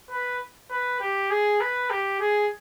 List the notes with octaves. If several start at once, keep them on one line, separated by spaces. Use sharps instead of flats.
B4
B4
G4
G#4
B4
G4
G#4